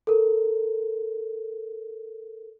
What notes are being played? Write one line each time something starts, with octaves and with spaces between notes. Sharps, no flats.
A4 A#4